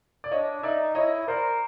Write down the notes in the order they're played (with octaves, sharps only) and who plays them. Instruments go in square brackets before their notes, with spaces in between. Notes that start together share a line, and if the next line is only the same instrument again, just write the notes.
[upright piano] D5
[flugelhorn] D4 [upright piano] C#5 D#5
[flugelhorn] D#4 [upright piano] D5 E5
[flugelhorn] E4 [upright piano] C#5 D#5
[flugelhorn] A#4 [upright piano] C5 D5